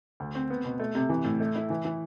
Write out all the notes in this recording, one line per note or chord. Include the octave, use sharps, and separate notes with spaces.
D2
C4
B3
B2
A3
C3
E3
A2
A3
E4
E3
E3